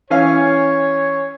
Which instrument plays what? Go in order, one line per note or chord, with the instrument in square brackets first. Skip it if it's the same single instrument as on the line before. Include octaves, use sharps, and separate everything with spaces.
[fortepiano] E3 C#4 F5 [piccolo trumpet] C#5